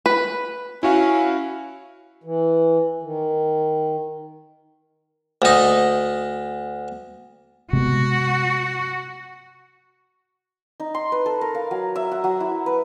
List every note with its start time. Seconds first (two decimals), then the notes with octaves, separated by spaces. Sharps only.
0.06 B4
0.83 C#4 E4 F#4 F5
2.24 E3
3.03 D#3
5.42 D2 D#4
7.73 C3 G#3 B3 F#4
10.80 D#4
10.95 C6
11.12 B4
11.26 A4
11.41 A#4
11.55 F5
11.71 F#3
11.96 E5
12.11 F#5
12.24 F#3
12.40 E4
12.66 B4